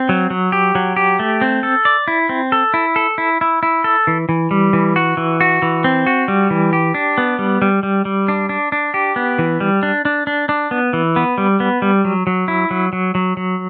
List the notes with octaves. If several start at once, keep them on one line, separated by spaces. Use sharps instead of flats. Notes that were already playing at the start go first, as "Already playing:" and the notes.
Already playing: C4
F#3
F#3
G4
F#3
G4
A3
C4
A4
D5
E4
C4
A4
E4
A4
E4
E4
E4
A4
E3
E3
G3
E3
F#4
E3
F#4
E3
C4
F#4
G3
E3
G4
D4
B3
G3
G3
G3
G3
D4
D4
D4
G4
B3
E3
G3
D4
D4
D4
D4
B3
E3
B3
G3
B3
G3
F#3
F#3
E4
F#3
F#3
F#3
F#3